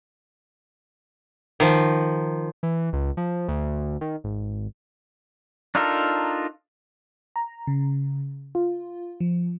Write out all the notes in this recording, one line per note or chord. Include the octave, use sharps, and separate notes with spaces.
D#3 F3
E3
C#2
F3
D2
D#3
G#1
D4 D#4 F4 A4 A#4
A#5
C#3
F4
F3